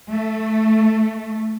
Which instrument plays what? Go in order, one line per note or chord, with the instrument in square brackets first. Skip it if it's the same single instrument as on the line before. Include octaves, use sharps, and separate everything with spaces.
[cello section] A3